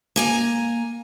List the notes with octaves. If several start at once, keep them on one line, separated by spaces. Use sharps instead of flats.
A#3 G#5 A#5